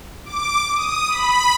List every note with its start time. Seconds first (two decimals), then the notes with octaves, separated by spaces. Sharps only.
0.25 D6
0.73 D#6
1.08 B5